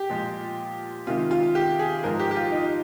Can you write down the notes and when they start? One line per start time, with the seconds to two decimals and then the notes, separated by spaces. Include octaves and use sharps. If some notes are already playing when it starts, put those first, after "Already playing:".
Already playing: G4
0.10 A#2 F3 G#3
1.07 C3 D#3 G#3 F4
1.31 F4
1.55 G4
1.79 G#4
2.04 G#2 F3 G#3 A#4
2.19 G4
2.31 G4
2.36 F4
2.52 D#4